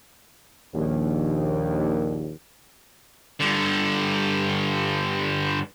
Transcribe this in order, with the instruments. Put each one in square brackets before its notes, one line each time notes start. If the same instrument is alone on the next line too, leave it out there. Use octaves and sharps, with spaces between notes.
[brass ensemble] A#1 D#2
[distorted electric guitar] G2 D3